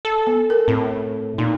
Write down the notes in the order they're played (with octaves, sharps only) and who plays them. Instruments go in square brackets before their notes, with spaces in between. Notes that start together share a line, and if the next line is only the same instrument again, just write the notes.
[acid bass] A4
[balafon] B3
A#4
[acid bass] A2 [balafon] C4
[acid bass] A#2 [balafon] D#4